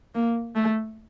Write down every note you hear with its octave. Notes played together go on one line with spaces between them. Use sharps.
A#3
A3